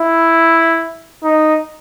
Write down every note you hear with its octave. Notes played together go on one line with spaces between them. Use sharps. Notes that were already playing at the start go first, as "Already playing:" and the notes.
Already playing: E4
D#4